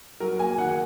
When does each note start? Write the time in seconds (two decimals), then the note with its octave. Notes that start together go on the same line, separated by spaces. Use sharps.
0.20 F#3 A#4
0.39 A#3 G#5
0.58 D#3 F#5
0.69 F#5